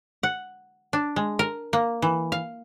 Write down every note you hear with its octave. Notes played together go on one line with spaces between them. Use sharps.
F#5
D4
G#3
A#4
A#3
E3
F5